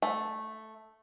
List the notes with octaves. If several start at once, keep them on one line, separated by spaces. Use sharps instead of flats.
A3